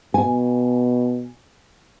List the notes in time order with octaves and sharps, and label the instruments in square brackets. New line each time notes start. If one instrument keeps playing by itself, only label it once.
[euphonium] B2 [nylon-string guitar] G#5